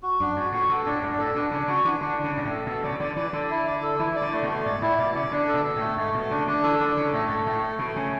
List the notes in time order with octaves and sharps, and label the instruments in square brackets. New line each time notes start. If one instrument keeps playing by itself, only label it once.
[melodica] F#4
[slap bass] F#2 [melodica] D4
[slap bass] G#2 [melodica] F#4
[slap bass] A2 [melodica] F#4
[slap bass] B2 [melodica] A4
[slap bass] A2 [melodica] D4
[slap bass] F#2 [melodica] D4
[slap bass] A2 [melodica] A4
[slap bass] B2 [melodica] D4
[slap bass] C#3 [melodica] D4
[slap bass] C#3 [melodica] F#4
[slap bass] E3 [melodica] D4
[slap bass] D3 [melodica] D4
[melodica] D4
[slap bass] C#3
[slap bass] G#2 [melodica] D4
[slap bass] A2
[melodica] A4
[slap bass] B2 [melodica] A4
[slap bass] C#3 [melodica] D5
[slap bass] D3 [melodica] D5
[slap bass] E3 [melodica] D5
[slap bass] D3 [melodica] A4
[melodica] E4
D5
A4
[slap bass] E3 [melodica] E4
[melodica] D5
[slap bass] D3
[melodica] A3
[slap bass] B2
[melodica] A3
[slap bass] G#2 [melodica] D5
[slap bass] A2 [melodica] E4
[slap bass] B2 [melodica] D5
[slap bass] C#3 [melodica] D5
[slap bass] D3 [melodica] D4
[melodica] A4
[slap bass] B2
[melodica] A4
[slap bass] A2 [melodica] A3
[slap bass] G#2 [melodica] A3
[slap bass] B2 [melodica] A3
[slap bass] C#3 [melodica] D4
[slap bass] D3 [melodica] D4
[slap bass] E3 [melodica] A4
[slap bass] D3 [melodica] D4
[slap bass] C#3 [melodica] A4
[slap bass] A2 [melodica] A3
[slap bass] G#2 [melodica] A4
[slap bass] A2 [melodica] A3
[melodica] A3
[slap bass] B2 [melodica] A3
[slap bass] C#3 [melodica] C#4